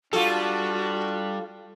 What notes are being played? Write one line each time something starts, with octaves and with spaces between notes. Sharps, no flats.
G3 D4 F4 F#4 A4